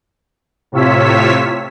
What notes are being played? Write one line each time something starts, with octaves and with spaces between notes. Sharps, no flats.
A2 C3 F4 C#5 E6 B6